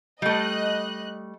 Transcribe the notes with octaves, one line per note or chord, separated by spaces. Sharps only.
G3 A3 D#5 F#6